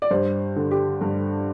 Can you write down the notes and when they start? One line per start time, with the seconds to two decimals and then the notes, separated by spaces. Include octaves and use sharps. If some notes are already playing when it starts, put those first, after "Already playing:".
0.02 D5
0.11 G2 C5
0.56 D3
0.71 G4
1.01 G2